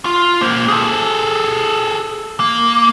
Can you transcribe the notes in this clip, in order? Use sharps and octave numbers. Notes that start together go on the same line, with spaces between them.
F4
A#3 C5
G#4 A4
A#3